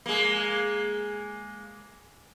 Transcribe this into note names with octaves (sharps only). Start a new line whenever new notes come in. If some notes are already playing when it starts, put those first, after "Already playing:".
G#3 A#3